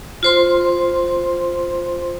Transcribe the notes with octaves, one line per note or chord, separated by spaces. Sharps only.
F4 C5 C6